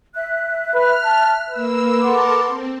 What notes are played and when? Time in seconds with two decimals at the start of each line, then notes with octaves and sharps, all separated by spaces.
0.14 E5 F#6
0.74 B4 F6
1.05 A5
1.50 A#3 B4 E6
2.01 A4 A#4 F#5 A5 C6 D6
2.45 C4